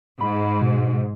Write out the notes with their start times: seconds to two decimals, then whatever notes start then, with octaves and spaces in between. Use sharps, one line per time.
0.21 G#2 B5
0.62 B2